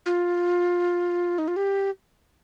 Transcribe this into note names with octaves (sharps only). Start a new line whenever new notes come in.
F4
D#4
F4
G4